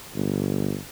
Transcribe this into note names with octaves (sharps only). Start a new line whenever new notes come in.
G1